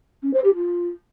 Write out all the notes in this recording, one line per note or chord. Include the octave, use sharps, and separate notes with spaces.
C#4
C5
G4
F4